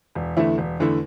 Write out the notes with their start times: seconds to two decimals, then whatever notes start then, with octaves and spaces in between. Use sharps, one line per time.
0.15 E1
0.37 E2 D3 A3 E4
0.58 E1
0.80 E2 D3 A3 E4